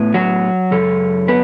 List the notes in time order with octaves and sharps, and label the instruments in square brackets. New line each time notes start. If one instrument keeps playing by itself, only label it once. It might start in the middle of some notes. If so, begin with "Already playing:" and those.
Already playing: [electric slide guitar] A2 B3
F#3 F#4
F#2 C#3 A4
B3 B4